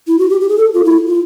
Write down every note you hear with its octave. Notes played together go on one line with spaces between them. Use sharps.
E4
F#4
G4
G4
G#4
A4
F4
E4
F4